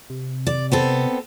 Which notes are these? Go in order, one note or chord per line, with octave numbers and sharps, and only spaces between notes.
C3
D5
B3 C4 A4